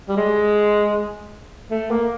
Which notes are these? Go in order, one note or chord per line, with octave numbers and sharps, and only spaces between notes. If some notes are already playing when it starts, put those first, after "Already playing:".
G3
G#3
A3
A#3